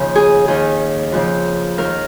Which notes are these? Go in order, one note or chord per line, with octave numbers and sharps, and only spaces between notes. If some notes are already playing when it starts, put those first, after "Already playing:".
Already playing: D#2 C#3 F3
G#4
D#2 D#3 G#4
F2 C#3 F3
D#2 D#3 A#4